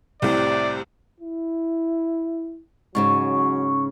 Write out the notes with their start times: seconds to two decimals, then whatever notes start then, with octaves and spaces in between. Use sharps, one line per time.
0.22 C2 A2 C3 D5
1.20 E4
2.95 G#2 C#3 F#3 C#4 C#6